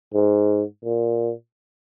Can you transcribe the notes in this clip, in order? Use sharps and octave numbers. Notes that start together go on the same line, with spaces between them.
G#2
A#2